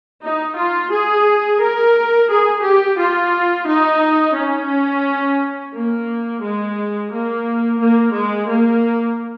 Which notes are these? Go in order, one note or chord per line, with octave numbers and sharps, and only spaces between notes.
D#4
F4
G#4
A#4
G#4
G4
F4
D#4
C#4
A#3
G#3
A#3
A#3
G#3
A#3